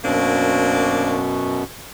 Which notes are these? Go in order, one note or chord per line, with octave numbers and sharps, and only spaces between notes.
F#2 B2 A#3 C4 D4